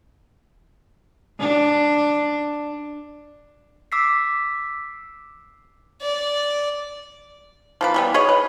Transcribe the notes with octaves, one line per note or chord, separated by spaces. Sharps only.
D4
D6 E6 B6 C7
D5
F3 A#3 B4
E3 G3 B3
G#4 B4 C#5 D#5
B4